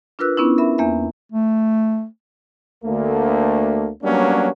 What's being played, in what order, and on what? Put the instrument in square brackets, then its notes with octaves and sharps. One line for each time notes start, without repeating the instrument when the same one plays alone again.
[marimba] D4 F4 A#4 B4 E6 F#6
B3 C#4 D4 E4
A#4 E5 B5
E2 A#3 E5
[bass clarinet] A3
[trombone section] D2 A3 A#3
F#3 G3 A#3 B3 C#4 D4